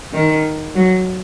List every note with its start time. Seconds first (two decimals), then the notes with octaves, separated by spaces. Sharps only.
0.13 D#3
0.75 F#3